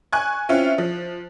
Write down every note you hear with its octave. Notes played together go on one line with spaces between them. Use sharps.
G#5 C#6 F#6 G#6
C4 C#4 E4 F4
F3